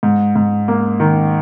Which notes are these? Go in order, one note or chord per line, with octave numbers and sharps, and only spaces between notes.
G#2
G#2
A#3
D#3